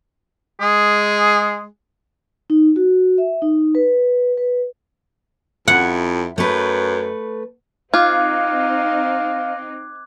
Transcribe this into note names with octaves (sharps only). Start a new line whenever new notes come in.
G#3 G#4
D#4
F#4
E5
D#4
B4
B4
F2 E4 F#5
F#2 A3 B4
C4 D#4 F4 F5 D6 F#6 G#6